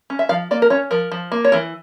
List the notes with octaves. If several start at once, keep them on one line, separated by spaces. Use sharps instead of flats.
C#4
E5
F3 F5
A#3 D5
A#4
C#4 C#5
F3 A#4
F3
A#3
C#5
E3 A#4